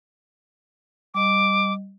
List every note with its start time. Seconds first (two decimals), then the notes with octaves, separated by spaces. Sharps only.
1.14 G3 D#5 D6